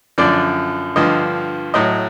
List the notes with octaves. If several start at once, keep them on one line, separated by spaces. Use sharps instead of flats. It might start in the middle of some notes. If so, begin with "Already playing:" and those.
F#2 D3 F3 D5
G2 D3 F3 D#5
A2 F#3 D#5